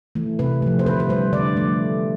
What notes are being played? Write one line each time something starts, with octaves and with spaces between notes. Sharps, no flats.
E3 A3
C3 B4
F3 A3
C5
D3 B4
B4
G3 C5
D3 D5
F3 A3